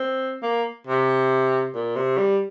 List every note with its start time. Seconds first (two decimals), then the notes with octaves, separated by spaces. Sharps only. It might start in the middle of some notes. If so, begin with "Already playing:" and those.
Already playing: C4
0.43 A#3
0.87 C3
1.75 A#2
1.96 C3
2.18 G3